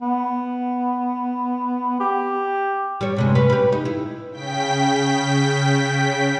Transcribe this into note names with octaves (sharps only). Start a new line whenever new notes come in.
B3
G4
G3 C#5
G2 C3 G#3
C#4 B4
G4 B4
D#4
E4
C#3 G5 B6